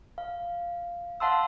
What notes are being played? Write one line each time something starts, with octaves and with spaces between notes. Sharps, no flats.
F5
F5 F#5 A5 C6 E6